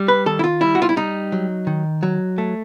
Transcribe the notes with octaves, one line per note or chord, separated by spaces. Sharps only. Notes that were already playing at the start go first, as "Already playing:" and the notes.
Already playing: G3
B4
D#3 A4
E4
F4
G3 E4
F#4
F4
E4
G3 D#4
F#3
D#3
F#3
A3